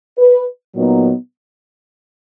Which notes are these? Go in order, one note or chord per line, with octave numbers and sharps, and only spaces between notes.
B4
A#2 F#3 B3 D#4